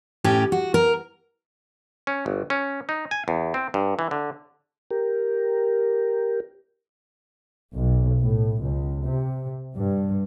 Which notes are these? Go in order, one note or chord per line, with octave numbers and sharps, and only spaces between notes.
A2 C#4 G4
F#4
A#4
C#4
G1
C#4
D#4
G#5
E2
C4
G2
E3
D3
G4 A#4
B1
A2
C#2
C3
G2